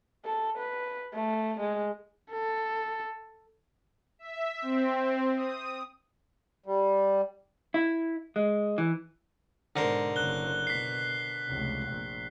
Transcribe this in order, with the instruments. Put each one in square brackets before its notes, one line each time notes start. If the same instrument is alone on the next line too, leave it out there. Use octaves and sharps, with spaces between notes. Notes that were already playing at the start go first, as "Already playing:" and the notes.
[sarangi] A4
B4
A3
G#3
[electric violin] A4
[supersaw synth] E5
C4
D#6
[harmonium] G3
[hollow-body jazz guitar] E4
G#3
E3
[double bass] G#2 B2 [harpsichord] D3 A#4 C5
[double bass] F#1 [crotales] F#6 G7
[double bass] B2 [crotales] B6 C7
[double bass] F1 C#2
A#1